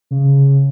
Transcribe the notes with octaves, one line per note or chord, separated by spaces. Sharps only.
C#3